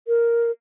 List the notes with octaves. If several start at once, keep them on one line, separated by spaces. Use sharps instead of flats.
A#4